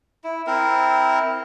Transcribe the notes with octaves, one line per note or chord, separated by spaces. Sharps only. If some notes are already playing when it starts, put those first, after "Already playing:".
E4
C4 E4 A#4